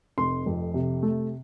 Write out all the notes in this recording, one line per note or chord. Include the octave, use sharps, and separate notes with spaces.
F1 C6
F2
C3
A3